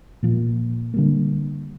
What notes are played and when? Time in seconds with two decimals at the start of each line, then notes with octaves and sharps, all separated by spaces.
0.22 A#2 F3 A#3
0.94 D3 G3 A#3